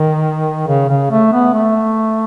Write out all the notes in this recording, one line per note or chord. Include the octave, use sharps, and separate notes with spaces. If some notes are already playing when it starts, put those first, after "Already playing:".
Already playing: D#3
C#3
C#3
A3
B3
A3